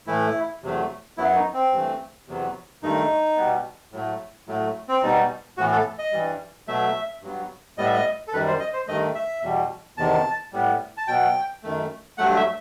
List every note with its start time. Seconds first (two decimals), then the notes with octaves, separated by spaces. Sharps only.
0.07 A2 E3 A3 E4
0.62 E2 C3 F#3 A3
1.17 F#2 F#3 B3 E4
1.36 D#4
1.54 C4
1.72 G2 E3 A3
2.27 E2 C3 F#3 B3
2.82 G2 D#3 A3 D#4
3.37 B2 G3 B3
3.92 A2 F#3 A3
4.47 A2 F#3 A3
4.88 C4
5.03 B2 G3 B3 D#4
5.57 A2 E3 B3 F#4
5.72 A4
5.99 D#5
6.12 G2 E3 G3
6.68 B2 F#3 A3 E5
7.22 G2 F#3 B3
7.77 A2 G3 B3 D#5
7.85 E5
7.93 D#5
8.28 A4
8.33 F#2 D#3 G3 B4
8.47 C5
8.60 D#5
8.73 C5
8.87 G2 D#3 A3 D#5
9.15 E5
9.43 E2 B2 G3
9.98 E2 C3 D#3 A5
10.53 A2 G3 B3
10.97 A5
11.08 B2 F#3 B3 G5
11.63 F#2 D#3 A3
12.18 G2 F#3 A3 F#5
12.36 E5